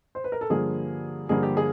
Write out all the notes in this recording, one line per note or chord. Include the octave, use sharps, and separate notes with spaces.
C5
B4
A#4
A4
G2 D3 F3 A#3 G#4
G2 D3 F3 A#3 G#4
G4
G#4